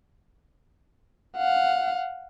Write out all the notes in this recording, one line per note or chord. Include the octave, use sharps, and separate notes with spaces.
F5 F#5